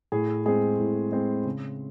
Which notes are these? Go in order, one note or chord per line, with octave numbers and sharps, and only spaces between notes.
A2 G#4
G#3 C4 G#4
A2
G#3 C4
C#3